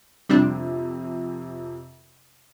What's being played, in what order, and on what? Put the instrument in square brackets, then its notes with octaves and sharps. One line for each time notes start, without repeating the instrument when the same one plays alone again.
[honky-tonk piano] F2 C3 [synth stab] G3 C4 D4